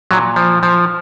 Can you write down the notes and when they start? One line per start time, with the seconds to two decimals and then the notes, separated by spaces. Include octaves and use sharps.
0.11 A#2 F#3
0.36 F3
0.63 F3